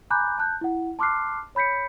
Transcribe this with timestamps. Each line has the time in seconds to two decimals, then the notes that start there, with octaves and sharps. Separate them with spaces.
0.10 G#5 A#5 B5 D6 F#6 G6
0.39 A5 F#6 G6
0.61 E4 F#5
0.99 A5 C6 D6 F6 F#6 C7
1.55 C#5 B5 G6 B6 C#7